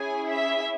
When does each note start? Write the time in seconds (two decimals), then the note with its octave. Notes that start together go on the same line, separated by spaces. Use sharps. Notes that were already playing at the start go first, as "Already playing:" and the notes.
Already playing: C#4 E4 G#4 G#5
0.28 E5